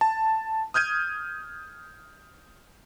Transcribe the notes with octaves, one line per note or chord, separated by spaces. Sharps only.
A5
D#6 F6 G6 G#6 D#7